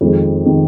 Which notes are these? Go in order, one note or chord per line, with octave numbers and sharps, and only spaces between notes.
F2 D#3 G#3 C4
D#3 G#3 C4